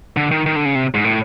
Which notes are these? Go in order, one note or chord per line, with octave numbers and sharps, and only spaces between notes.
D3
D#3
D#3
D3
C#3
C3
G#2
A2